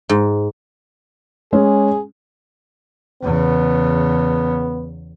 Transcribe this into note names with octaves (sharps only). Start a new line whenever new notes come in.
G#2
G#3 C#4 G#4
E2 C#3 B3